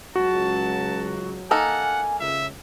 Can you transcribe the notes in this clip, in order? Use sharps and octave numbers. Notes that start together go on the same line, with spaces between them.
C#2 F#3 F#4 A5
A#3 D#4 A4 F#5 G#5 F6
C#2 E5